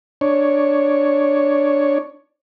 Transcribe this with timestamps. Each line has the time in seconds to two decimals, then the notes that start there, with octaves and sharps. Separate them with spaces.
0.21 D4 C#5